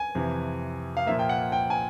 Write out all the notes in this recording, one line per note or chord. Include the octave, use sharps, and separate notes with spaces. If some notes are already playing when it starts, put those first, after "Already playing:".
Already playing: G#5
F2 C3 E3
F5
A#2 F3 A#3 E5
G5
F#5
G5
G#5